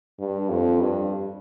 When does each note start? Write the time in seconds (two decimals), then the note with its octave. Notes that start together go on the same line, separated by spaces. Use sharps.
0.19 G2
0.50 F2
0.81 G2